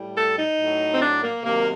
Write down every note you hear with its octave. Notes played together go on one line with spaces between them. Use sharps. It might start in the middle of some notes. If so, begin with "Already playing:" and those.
Already playing: A2 G3
A4
D#4
A2 F#3
C4
D4
A#3
C3 D#3 F#3 A#3